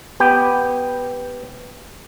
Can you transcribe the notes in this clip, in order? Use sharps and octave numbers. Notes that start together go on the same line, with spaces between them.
B3 G4 G5